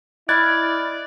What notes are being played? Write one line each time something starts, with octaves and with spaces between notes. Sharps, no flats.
E4 D5 D#5 B5 F6 F#6 G#6 A6